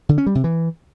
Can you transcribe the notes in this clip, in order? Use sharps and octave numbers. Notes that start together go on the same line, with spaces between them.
D3
C#4
G3
C3
E3